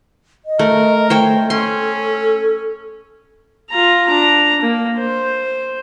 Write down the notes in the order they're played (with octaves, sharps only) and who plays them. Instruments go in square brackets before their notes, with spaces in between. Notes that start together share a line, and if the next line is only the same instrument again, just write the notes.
[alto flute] D#5
[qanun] A3 [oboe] A#4
[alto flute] A3 [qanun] C5 C#5 G5
[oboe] C#4 [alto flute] A4 [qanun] C6
[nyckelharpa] F4 A#5
D4 A#5
A#3
C5